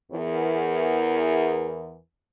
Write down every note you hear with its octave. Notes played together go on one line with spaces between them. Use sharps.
E2 A#4